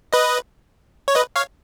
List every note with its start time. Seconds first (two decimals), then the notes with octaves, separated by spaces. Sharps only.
0.13 B4 D#5
1.08 C#5
1.15 B4 D#5
1.36 C#5 F5